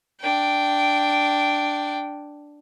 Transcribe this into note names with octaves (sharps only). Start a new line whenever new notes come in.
D4 G5